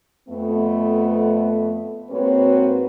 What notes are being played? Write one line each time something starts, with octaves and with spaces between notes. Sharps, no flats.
F2 A3 B3
G#2 A#3 C4 F#4 B4 C#5